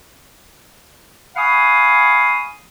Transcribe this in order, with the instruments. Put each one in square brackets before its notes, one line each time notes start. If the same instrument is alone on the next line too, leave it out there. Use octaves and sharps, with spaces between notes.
[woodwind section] F5 F#5 G#5 B5 C#6 D#6